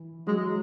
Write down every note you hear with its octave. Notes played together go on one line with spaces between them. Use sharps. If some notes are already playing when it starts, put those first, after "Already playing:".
Already playing: E3
F#3 G#3